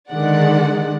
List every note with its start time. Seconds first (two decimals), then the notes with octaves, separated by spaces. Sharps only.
0.11 D3 D#3 G#3 D5 F#5